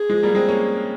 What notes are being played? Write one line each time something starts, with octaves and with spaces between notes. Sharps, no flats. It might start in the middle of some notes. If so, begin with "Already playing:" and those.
Already playing: G#4
F3 G#3
G3 A#3
G#3 C4
A#3 C#4